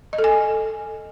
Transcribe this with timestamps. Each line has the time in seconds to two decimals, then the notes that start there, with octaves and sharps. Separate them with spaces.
0.13 D#5
0.18 A4
0.24 G#5